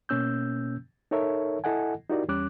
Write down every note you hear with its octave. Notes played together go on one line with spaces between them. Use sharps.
B2 A#3 C#4 E6 G6
D#4 A4 A#4 C#5 E5
E4 A4 D#5 F#5 G#5
D#4 E4 F#4 G4 A#4 D5
E2 G3 C#4 D6 F#6